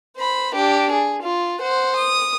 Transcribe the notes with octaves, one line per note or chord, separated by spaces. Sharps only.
C5 B5
D4 G4
G#4
F4
C5 F#5
D#6